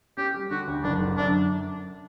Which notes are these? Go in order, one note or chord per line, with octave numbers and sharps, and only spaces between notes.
C#4 G4
G3
D3 F#4
D2
F#1 D4
D3
F#2 D4